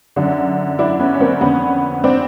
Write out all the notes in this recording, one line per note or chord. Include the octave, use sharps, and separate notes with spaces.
F#2 D3
D4 E4
B3 C#4
C#4
A#3 C4
F2 D3 B3 C#4
C4 D4